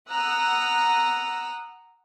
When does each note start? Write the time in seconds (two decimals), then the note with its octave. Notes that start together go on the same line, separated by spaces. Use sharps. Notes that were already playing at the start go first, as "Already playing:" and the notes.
0.11 F#5 A#5 D#6 E6 F#6